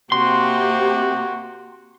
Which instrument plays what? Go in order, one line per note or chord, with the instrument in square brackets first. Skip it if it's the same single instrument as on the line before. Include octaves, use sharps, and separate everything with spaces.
[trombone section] C3 [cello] A#3 G4 [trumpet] F#4 [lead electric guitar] C6